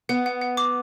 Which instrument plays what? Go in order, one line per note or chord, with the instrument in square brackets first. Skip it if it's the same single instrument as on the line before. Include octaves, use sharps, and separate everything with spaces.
[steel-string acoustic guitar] B3 [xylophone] F#5
[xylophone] F#5
F#5
D6